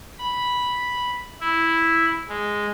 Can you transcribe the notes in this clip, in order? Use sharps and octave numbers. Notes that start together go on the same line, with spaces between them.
B5
E4
G#3